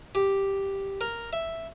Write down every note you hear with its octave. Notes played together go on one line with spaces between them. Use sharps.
G4
A#4
E5